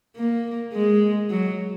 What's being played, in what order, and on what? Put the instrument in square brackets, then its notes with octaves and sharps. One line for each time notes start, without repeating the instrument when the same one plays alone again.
[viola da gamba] A#3
G#3
F#3